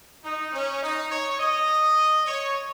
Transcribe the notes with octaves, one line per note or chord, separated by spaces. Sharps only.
D#4
C#4
D#4
C#5
D#5
C#5